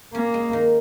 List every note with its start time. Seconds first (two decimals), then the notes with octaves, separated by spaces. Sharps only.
0.14 A#3 C#4
0.34 G#3
0.53 D#3